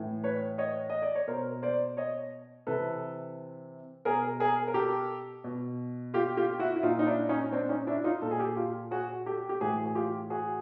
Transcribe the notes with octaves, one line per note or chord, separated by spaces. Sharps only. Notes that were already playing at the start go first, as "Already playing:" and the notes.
Already playing: A2 E3
B4 C#5
C#5 D#5
D#5
D5
C#5
B2 A#4 C5
C5 D5
C#5 D#5
C3 E3 A4 B4
B2 G#4 A#4
G#4 A#4
A#4
G4 A4
B2
F4 G4
F4 G4
E4 F#4
E4
A#2 D#4 F4
D#4
D4 E4
C#4 D#4
C4 D4
C#4 D#4
D4 E4
D#4 F4
A#2 A4
G#4
G4 A4
F4 G4
F#4 G#4
G4 A4
G4
A2 E3 F#4 G#4
G#4
F4 G4
F#4 G#4